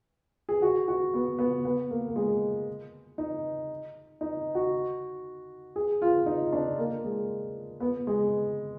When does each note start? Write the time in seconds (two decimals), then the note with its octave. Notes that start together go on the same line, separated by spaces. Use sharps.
0.49 G#4
0.62 F#4
0.88 F#4
1.14 B3
1.39 B3
1.65 B3
1.90 A#3
2.08 A#3
2.16 G#3
3.18 D#4
4.21 D#4
4.55 F#4
5.76 G#4
6.02 F4
6.26 D#4
6.52 D4
6.78 A#3
7.04 G#3
7.80 B3
8.07 G#3